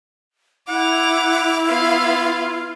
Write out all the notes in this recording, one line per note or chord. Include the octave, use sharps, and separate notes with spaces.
E4 F#5 D6 F7
B3 F4 F5